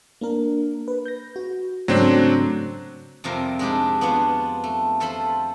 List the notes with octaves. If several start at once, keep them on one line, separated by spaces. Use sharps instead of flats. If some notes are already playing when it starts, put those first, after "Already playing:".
A#3 D4 A#4
B4
G6 A#6
F#4
G#2 C#3 F#3 A3 C4 D4
F2 C3 G3 F4 A#4 C5
G#3 C4 D4 D#4 G4 G#4
B3 D4 F4 C5 C#5
A3
F4 A4 C5 B5 C6